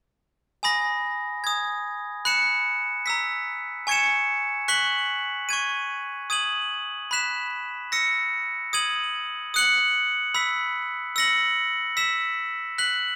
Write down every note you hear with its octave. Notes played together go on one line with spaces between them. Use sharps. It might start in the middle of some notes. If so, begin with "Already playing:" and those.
G#5 B5 D#6 A#6
G#5 D#6 G#6
B5 F#6 C#7 E7
A#5 E6 B6
G#5 C#6 G#6 C#7 E7
C#6 F#6 B6 F#7
C#6 G#6 D#7
D#6 G#6 D#7 F#7
B5 F#6 B6 E7
E6 A#6 C#7
D#6 G#6 D#7 F#7
D#6 F#6 C#7 F#7
B5 E6 B6
E6 A#6 C#7 F#7
E6 B6 E7
F#6 B6 F#7